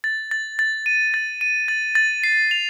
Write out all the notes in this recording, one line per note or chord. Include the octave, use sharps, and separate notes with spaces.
A6
A6
A6
D#7
A6
D#7
A6
A6
C7
F7